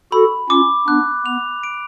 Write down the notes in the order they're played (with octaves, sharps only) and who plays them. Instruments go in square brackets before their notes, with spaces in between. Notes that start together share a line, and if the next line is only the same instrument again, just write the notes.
[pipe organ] F#4 A4 [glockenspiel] B5
[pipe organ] C#4 F4 [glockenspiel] D6
[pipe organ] B3 D4 [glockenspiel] F#6
[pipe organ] B3 [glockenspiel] F7
[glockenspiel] D7